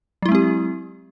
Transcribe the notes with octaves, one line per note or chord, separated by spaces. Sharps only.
F#3 G#3 C4 E4 G4